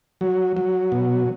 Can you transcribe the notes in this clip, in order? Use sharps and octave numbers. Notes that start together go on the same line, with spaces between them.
F#3
F#3
B2